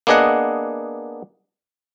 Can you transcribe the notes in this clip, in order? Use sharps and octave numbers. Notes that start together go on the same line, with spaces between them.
A#3 B3 D4 G#4 D#5 F#5